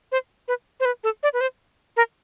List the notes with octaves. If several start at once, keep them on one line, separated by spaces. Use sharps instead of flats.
C5
B4
C5
B4
A4
D5
B4
C5
A#4